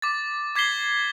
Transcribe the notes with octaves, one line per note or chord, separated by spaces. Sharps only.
D6 A6
D6 G#6 B6 C7 G7